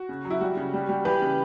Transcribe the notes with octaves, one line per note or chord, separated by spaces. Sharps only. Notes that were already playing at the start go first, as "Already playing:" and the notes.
Already playing: F#4
C#3
F#3
E4
G3 F#4
C#3
G3
G3
E3 G4 B4
C#3